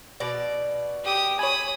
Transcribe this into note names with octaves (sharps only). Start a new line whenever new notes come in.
B2 D5
G4 D#6
C#5 G#5 B5 D#6